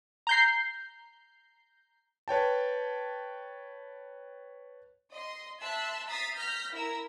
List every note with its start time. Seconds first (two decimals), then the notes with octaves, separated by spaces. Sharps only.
0.27 A#5 G6 C7
2.28 B4 C#5 G5 A5
5.12 D#5 C6
5.60 E5 A5 C6 E6 F#6
6.07 E5 A#5 D#6 A6 B6 C7
6.36 F6 G6 A#6 B6
6.73 E4 A#4 A#5 E6